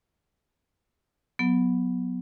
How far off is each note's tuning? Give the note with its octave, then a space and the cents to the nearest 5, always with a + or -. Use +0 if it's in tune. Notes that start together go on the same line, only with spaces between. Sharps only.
F#3 -15 B3 +0